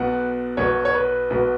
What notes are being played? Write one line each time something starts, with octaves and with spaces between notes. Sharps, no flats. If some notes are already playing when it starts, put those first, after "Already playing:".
Already playing: B1 B2 B3 F#5
B1 B2 B3 C#5
C#5
B4
B1 B2 B3